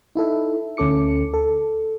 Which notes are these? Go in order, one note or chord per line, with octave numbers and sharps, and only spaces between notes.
D#4 E4 A4 E5
D2 C#4 A4 D6 C#7
A4